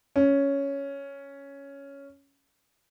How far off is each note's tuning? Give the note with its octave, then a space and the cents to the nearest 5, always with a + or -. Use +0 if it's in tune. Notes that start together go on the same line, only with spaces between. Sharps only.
C#4 +5